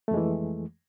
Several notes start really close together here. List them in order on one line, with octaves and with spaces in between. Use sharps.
A3 F2 G#3 E3